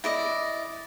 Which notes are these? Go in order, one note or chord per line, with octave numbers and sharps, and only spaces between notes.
E4 D5 D#5